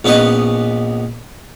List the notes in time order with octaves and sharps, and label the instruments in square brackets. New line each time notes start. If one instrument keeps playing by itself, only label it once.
[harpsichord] A#1 B3 C#4 B4 D#5